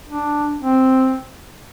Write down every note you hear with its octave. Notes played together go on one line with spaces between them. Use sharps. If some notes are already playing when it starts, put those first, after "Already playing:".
D4
C4